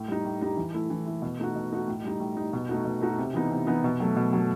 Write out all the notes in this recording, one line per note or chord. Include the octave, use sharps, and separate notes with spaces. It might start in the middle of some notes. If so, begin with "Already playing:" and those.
Already playing: A2
G3 D#4
A2
G3 D#4
E3
A3 E4
E3
A3 E4
B2
A3 D#4 F#4
B2
A3 D#4 F#4
A2
G3 D#4
A2
G3 D#4
B2
A3 D#4 F#4
B2
A3 D#4 F#4
C3
E3 B3 D#4
C3
E3 B3 D#4
B2
F#3 A3
B2
F#3 A3